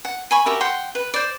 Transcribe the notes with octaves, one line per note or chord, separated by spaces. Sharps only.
F#5
G#5 B5 C#6
F#4 G4 A#4 E5
F#5 G5 C6
B4
C5 D5